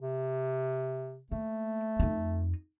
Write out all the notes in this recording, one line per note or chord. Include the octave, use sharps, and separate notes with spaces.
C3
A3 A#3
F2 D#4